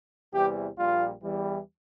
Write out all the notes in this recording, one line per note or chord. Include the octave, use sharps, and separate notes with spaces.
E2 C3 E3 G3 G4
A#1 A#2 G3 F4
E2 E3 G3